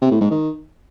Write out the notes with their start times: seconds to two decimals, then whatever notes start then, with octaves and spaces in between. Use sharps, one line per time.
0.01 C3
0.11 A2
0.21 G#2
0.31 D#3